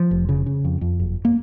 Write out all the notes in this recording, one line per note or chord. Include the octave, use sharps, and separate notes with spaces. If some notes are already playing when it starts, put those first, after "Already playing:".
Already playing: F3
F1
C#3
C#3
F2
F2
F#1
A#3